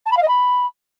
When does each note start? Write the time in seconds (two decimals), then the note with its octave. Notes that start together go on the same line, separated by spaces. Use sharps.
0.06 A5
0.11 B5
0.17 F5
0.22 D#5
0.28 B5